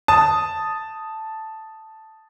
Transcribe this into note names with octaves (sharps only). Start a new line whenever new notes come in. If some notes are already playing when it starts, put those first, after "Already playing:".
A5 D#6